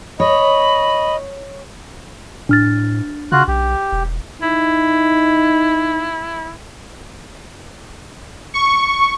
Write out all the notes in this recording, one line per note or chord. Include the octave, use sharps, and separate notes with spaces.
C#5 D#5 B5
A2 D4 F6 A6
C#3 F4 F#4 F#6
B1 G4
E1
D#4 E4
C#6